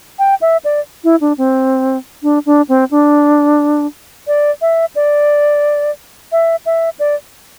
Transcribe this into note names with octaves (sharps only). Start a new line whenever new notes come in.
G5
E5
D5
E4
D4
C4
D4
D4
C4
D4
D5
E5
D5
E5
E5
D5